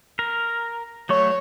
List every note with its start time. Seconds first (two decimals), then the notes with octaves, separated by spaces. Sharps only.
0.19 A#4
1.09 F#3 A3 C#5 C#6